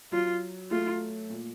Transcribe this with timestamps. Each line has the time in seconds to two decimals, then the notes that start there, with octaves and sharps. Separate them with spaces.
0.12 F#3 F4
0.71 A3 F4
1.30 A#2